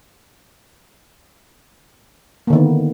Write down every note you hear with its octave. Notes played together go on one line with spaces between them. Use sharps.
D3 D#3 A#3 B3